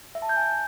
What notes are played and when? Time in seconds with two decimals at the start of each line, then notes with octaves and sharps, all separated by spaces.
0.15 E5
0.22 A5
0.29 G6
0.37 G#5